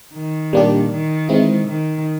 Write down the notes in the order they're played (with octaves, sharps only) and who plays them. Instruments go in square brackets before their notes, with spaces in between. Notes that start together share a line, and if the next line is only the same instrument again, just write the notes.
[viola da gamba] D#3
[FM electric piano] A#2 G3 A#3 D4 G4
[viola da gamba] D#3
[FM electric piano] E3 G#3 C4 E4
[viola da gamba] D#3